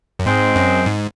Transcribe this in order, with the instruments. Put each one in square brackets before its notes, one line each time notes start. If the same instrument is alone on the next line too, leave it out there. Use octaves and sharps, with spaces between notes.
[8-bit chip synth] F#2
[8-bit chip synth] G#2 [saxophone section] G#3 C4
[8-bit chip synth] F#2
G#2